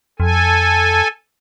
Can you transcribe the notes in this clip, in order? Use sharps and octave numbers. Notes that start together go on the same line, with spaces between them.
F2 A4 G#5